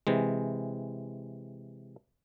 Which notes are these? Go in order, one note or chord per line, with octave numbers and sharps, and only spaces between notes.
C3 E3 G#3